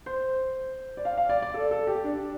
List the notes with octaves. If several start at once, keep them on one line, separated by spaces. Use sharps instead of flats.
C5
D5
F5
F5
D5
D5
A4
A4
G4
D4